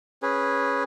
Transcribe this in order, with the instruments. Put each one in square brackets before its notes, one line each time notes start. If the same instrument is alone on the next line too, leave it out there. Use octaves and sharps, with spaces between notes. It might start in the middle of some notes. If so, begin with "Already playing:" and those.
[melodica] C#4 G#4 B4